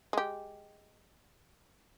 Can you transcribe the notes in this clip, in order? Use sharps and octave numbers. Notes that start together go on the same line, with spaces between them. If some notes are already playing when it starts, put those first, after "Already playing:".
G#3 G4